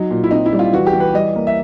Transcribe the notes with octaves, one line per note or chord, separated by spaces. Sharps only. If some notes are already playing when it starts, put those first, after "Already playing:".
Already playing: F#3 D#4
A#2
E4
C4 D#4
E4
G3
F4
E3 F#4
G4
E3
B4
G3 D#5
A#3
E5